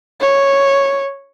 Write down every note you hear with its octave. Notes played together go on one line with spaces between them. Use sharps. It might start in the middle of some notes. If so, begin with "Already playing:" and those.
C#5